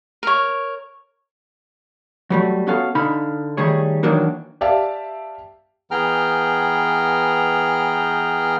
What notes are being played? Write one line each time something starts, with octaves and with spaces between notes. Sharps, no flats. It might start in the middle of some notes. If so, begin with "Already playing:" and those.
A#4 C#5
F#3 G3 A3
B3 C#4 F#4 A4 F5
D3 D#4 F5 B5
D#3 G3 A3 G#4 C#5
D#3 E3 F#3 A#3 D4 D#4
G4 D5 E5 F5 A5
E3 B3 G#4 G5 A#5 F6